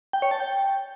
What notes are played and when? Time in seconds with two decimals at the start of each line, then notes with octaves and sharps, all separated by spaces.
0.13 G5
0.22 C#5
0.31 A5
0.40 G5